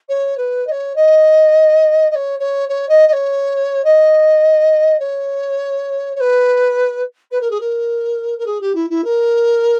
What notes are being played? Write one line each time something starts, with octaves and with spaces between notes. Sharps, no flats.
C#5
B4
D#5
C#5
D#5
D#5
C#5
C#5
C#5
D#5
D#5
C#5
D#5
C#5
C#5
B4
B4
A#4
G#4
A#4
A#4
G#4
G4
E4
E4
A#4